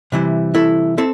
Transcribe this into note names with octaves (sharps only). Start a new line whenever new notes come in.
C3 E3 G3 E4
E4 A4
C4 E4 A4